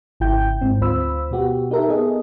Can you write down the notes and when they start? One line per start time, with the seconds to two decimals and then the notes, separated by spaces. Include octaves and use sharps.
0.20 G#1 C#3 E4 G5 G6
0.61 G#2 C4
0.81 D2 F4 C5 B5 E6
1.31 B2 B3 F#4 G4
1.71 D#4 G4 A4 A#4 E5
1.89 B3 G#4 A4 D#5